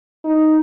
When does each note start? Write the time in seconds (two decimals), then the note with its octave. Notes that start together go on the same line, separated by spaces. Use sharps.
0.24 D#4